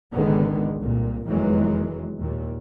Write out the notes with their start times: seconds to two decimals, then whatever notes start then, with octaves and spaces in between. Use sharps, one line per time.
0.14 G#1 C#2 D3 D#3 G#3 B3
0.81 C2 A#2
1.28 F1 E2 D#3 E3 F#3 G#3
2.19 D#2 A#2